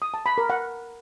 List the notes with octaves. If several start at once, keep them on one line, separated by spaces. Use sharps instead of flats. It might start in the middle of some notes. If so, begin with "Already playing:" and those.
D#6
A5
B5
A#4
F#5